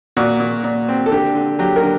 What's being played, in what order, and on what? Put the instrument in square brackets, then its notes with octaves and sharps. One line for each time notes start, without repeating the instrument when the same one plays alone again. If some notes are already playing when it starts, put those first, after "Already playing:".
[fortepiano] A#2 F#4
A#2
A#2
C4
A4
D3 G4
D3
F#3 G4
A#4
D3